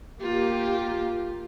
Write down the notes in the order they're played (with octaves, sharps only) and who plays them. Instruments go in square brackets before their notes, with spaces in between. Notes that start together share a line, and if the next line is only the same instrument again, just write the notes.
[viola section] A#3 G4 [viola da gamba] F4